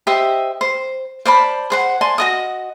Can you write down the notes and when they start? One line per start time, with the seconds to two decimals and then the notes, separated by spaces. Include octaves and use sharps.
0.07 G4 C5 D#5 E5
0.61 C5
1.25 C5 D5 A5 B5
1.70 G#4 C5 F#5
2.01 D5 G#5 A5 C6
2.18 F#4 D#5 D#6